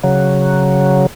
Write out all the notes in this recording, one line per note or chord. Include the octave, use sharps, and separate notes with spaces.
C#3 F#3